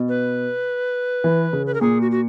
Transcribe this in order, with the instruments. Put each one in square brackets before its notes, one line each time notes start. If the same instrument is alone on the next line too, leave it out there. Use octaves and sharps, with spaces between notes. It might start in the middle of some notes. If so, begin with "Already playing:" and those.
Already playing: [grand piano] B2
[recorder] B4
[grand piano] E3
C#3
[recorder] B4
A#4
[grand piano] A#2 [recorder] G#4
[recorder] F#4
F#4